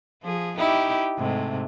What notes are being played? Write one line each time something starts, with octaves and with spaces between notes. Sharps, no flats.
F3 G#4
D#4 E4 G4
G#2 C3 A3